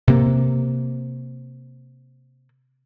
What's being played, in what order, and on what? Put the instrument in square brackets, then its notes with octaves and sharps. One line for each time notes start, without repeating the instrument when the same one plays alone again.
[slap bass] C3 A#3